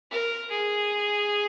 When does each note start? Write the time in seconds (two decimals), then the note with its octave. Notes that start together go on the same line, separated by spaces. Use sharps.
0.11 A#4
0.51 G#4